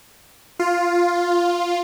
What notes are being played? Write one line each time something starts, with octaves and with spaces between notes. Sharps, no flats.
F4